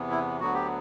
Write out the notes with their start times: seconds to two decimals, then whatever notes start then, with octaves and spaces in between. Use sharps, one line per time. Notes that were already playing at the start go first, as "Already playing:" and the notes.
Already playing: E2 C3 E3 B3
0.11 E4
0.40 D2 D3 F#3 B3 F#4
0.54 G4